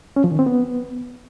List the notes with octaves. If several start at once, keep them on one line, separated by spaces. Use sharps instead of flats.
C#4
F3
D#3
C4
B3